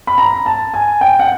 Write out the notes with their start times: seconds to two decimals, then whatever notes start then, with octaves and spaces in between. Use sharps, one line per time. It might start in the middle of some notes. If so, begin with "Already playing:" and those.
0.07 B5
0.18 A#5
0.46 A5
0.74 G#5
1.01 G5
1.19 F#5